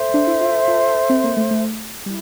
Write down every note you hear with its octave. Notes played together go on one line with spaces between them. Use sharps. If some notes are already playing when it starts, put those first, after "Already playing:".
Already playing: A4 C5 E5
D4
E4
F4
F4
C4
A#3
A3
A3
G3 E4